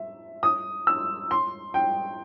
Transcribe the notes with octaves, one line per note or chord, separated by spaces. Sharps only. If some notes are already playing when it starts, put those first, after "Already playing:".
Already playing: E5
D#6
E6
C6
G5